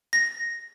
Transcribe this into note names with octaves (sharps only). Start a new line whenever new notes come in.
A#6